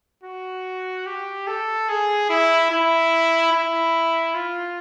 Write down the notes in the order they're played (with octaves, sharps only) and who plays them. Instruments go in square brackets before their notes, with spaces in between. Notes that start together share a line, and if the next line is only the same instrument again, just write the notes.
[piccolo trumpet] F#4
G4
A4
G#4
E4
E4
E4
F4